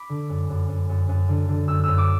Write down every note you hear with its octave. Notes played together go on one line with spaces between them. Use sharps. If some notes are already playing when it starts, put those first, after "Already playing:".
Already playing: B5 D6
D3
F#2
F#2
F#2
F#2
F#2
D3
D3
F#2 E6
F#2 E6
D6